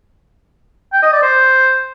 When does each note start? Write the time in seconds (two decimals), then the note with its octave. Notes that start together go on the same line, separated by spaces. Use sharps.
0.93 G5
1.03 D#5
1.12 D5
1.22 C5